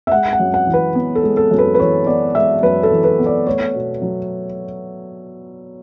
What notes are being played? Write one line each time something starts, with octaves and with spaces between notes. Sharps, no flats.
E5
G#3 F#5
F#5
F#2
F#5
E3
B4
B3
A4
G#3
A4
F#2
B4
B4
E3 C#5
B3 D5
G#3 E5
F#2 B4
A4
E3
B4
B3
D5
A3 C#5
B2
F#3